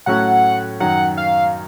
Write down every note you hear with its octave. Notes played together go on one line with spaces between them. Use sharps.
A2 F#3 A3 C#4 F#4 F#5
F#2 D#3 F#3 F#5
F5